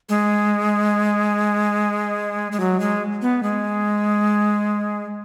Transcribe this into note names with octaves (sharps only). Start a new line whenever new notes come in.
G#3
G#3
F#3
G#3
B3
G#3